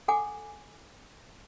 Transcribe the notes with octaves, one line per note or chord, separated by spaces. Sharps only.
A4 F#5 G#5 D6